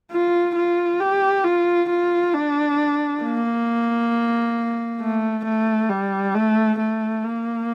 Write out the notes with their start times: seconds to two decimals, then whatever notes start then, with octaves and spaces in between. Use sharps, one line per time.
0.11 F4
0.55 F4
1.00 G4
1.44 F4
1.89 F4
2.34 D4
3.22 A#3
5.01 A3
5.45 A3
5.90 G3
6.35 A3
6.79 A3
7.24 A#3